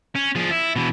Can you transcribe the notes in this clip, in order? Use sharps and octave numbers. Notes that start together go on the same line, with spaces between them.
C#4
F3 G#4
E4
B2 E3